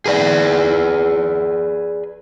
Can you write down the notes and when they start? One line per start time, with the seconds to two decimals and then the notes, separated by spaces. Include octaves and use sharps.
0.06 G#4 B4 D5